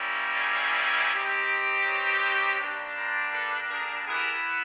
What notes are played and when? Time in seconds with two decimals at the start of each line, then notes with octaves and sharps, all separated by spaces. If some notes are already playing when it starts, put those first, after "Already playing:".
Already playing: G3 A#3 C#4 E4
0.37 G#4
1.12 C4 D#4 G4
1.84 B4 C#5
2.58 G3 A#3 D4
2.96 A#4 C5
3.33 A4 B4
3.69 G#4 A#4
4.06 B3 E4 G4 G#4 A#4